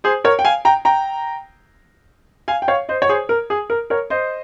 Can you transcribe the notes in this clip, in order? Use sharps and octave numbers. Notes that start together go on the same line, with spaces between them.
G#4 C5
A#4 C#5
G5
F5 G#5
G5 A#5
G5 A#5
F5 G#5
G5
C#5 F5
C5 D#5
C#5
G#4 C5
A#4
G#4
A#4
A#4 C#5
C5 D#5